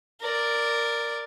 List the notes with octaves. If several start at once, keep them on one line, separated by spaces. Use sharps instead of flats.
A#4 D5